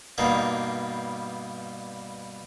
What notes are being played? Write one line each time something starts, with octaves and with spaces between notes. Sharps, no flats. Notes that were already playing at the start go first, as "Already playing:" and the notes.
G2 B2 G3 A#3 D#4